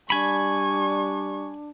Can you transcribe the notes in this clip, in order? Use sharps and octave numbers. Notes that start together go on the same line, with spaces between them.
G3 D4 G#5 B5 C#6